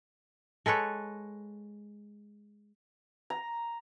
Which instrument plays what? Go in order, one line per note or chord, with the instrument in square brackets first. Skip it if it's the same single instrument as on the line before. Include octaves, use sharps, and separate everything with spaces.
[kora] G#3 A4 B4 C#5
[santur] A#5